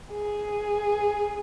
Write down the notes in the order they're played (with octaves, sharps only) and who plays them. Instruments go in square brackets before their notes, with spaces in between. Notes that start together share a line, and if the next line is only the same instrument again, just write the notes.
[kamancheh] G#4